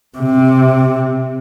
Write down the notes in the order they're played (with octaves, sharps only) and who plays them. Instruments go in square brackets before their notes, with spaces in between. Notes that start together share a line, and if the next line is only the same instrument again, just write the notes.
[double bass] C3